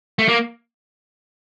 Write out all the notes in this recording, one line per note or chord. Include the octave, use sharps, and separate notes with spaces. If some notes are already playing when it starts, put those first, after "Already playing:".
A3
A#3